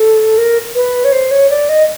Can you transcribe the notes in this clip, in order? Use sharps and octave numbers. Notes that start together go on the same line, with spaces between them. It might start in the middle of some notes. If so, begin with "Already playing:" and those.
Already playing: A4
A#4
B4
C#5
C5
C#5
D5
D#5